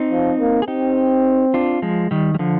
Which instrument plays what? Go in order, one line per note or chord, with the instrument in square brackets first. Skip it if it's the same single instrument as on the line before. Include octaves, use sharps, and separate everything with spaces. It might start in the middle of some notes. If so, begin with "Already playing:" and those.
Already playing: [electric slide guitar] C4 D#4
[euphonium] F3
A#3
[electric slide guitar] G#4
[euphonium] C4 [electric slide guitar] D#4 G4
[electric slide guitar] D4 F4
F3 G#3
D#3 G3
G3
D3 F3